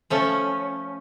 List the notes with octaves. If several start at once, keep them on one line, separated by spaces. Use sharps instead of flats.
F3 A3 C#4